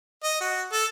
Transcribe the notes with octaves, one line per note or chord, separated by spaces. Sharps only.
D#5
F#4
A4